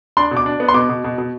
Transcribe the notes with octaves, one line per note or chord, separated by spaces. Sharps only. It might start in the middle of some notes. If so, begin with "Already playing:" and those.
D4 C6
B2
D6
D4
B3
C6
B2 D6
B2
B2
B2